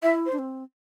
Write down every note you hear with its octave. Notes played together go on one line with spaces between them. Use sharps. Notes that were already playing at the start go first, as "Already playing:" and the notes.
E4 E5
C5
D4
C4